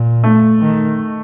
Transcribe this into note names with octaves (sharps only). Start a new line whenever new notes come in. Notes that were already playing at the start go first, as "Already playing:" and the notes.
Already playing: A#2
A3
D#3